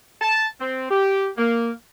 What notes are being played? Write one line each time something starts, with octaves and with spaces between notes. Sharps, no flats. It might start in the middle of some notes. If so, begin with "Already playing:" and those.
A5
C4
G4
A#3